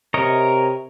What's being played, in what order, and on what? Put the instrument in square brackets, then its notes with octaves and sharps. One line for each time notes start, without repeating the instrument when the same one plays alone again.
[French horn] C3 [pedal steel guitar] A#4 C#5 D#5